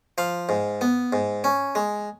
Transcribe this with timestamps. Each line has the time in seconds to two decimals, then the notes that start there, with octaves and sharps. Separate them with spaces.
0.18 F3 F5
0.49 G#2
0.81 B3
1.13 G#2
1.44 C#4
1.75 G#3